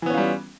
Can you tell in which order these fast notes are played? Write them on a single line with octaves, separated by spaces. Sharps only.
E3 B3 C#4 F4 G3